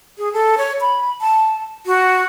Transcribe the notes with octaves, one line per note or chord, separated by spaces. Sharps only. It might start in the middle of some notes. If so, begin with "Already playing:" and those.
G#4
A4
C#5
B5
A5
F#4